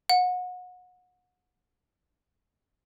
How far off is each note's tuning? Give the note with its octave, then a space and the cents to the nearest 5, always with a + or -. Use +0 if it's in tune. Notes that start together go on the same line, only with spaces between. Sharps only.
F#5 -30